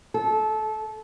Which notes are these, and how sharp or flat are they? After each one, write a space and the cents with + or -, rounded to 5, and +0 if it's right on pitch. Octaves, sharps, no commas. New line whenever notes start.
A4 -25